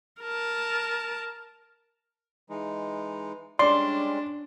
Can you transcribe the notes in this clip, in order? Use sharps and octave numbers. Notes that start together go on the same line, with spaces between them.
A#4 A5
E3 G#3 D#4
G3 G#3 C#4 D4 D5 C6 C7